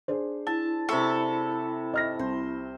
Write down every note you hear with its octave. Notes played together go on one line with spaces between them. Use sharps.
D4 G#4 C5
E4 A5
C3 E4 A4 E5 B5 C#6
D#5 F6 A#6
C2 C5